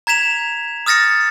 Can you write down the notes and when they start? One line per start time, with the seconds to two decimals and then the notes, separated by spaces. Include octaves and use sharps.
0.07 A#5 G#6 B6 E7 F7
0.86 D#6 F6 A6 A#6 C#7